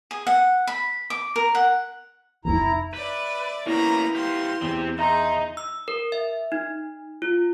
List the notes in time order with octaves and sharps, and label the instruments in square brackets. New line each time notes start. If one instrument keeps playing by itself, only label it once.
[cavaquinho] G#4
F#5
B5
D6
A#4
F#5
[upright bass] F1 D#4 [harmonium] E4 A#5
[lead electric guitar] B4 [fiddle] D5 E5
[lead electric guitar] A#3 C#4 [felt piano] B3 [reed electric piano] E4 [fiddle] A#5 B5
[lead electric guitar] G4 F5 [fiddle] C6
[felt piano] E2 [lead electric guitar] C4 G4
[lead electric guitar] D#4 [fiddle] G#4 [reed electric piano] E5 A#5 C6
[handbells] E6
A#4
E5
D#4
F4